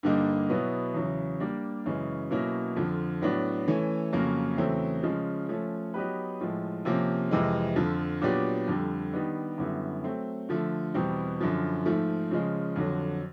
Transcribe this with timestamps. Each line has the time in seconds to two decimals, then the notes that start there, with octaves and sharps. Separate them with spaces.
0.03 G2 D3 G3 A#3 D#4
0.50 B2 F#3 B3 E4
0.94 E2 C#3 F#3
1.40 G3 A#3 D4
1.86 F#2 C#3 E3 G#3
2.31 B2 F#3 A#3 C#4 E4
2.76 F2 D3 F3
3.21 A2 F#3 B3 D4
3.68 E3 A3 C#4
4.12 F2 C#3 F#3 A#3 C#4
4.58 E2 C#3 F#3 A3 C4
5.03 C#3 F3 G#3
5.49 F3 A3 C#4
5.94 F#3 B3 D#4 G4 B4
6.40 A2 F3 G#3
6.85 C3 F3 A#3 C#4
7.31 F2 C3 E3 G#3
7.76 F2 D3 F3
8.21 A#2 F#3 B3 D4 G4
8.68 F2 D3 G3
9.13 D#3 G3 B3 D4
9.58 F#2 D3 G3 B3 E4
10.04 F#3 A3 C4
10.49 D3 F3 A3
10.94 E2 B2 G3 C4
11.41 F#2 D3 F3
11.85 G#2 F3 A3
12.31 C#3 F3 G#3
12.76 F2 D3 F#3